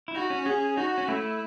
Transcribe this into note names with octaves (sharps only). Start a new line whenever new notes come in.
E4
D#4 F#4
C#4
C#4 G#4
D#4 F#4
C#4
A3 E4